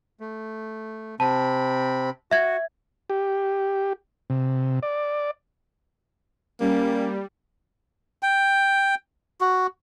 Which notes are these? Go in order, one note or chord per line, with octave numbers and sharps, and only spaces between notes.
A3
C3 C4 A5 B5
F#4 E5 G#6
G4
C3
D5
G3 A#3 C#4
G5
F#4